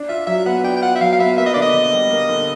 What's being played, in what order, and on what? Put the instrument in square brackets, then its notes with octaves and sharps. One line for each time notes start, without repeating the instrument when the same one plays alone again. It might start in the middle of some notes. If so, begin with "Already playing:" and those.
Already playing: [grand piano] D4
[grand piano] F4 [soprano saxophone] E5
[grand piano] F#3 [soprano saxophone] E5
[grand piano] B3 [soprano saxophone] F#5
[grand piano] D4 [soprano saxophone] G5
[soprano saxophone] G5
[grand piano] F4 [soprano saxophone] F#5
[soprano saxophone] E5
[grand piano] F#3 [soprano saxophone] F5
[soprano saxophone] F5
[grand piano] B3 [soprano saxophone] E5
[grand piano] A#3 [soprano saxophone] E5
[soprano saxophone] D#5
[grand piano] D3 [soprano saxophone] D5
[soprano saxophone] D#5
[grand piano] D3
G3
A#3
D3